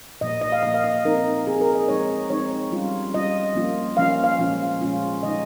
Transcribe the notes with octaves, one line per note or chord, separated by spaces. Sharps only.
A#2 F3 A#3 D#5
D#5
F5
A#2 F3 A#3 D#5
F5
D#5
F3 C4 D#4 A#4
F3 C4 D#4 G#4
A#4
D#5
F3 G#3 C4 D#4 C#5
F3 G#3 C4 D#4 C#5
G3 C#4 F4
G3 C#4 F4 D#5
F3 A#3 C#4 F4
F3 A#3 C#4 F4 F5
F5
A#2 F3 G#3 C#4 F4
A#2 F3 G#3 C#4 F4
D#3 G#3 D#4 D#5